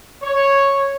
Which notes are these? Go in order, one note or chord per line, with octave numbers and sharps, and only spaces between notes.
C#5